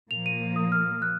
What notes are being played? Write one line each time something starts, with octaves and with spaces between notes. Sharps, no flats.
A#2 F3 A#3 F7
D#7
D#6
F6
F#6